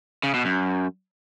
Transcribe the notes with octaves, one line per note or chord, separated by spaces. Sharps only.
C#3
B2
F#2